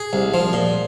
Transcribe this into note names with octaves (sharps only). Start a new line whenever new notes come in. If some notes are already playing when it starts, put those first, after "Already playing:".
Already playing: G#4
C2
F3
A#2